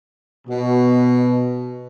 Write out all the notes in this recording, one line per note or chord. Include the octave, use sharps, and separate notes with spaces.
B2